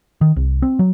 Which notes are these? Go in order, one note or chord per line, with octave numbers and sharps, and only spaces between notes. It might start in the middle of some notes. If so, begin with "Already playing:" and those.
D#3
C2
C4
F#3